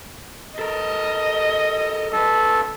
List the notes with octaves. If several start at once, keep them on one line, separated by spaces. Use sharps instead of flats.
A4 A#4 D#5
F#2 A4 B4